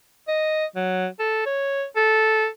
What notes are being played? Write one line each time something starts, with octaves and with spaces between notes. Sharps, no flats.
D#5
F#3
A4
C#5
A4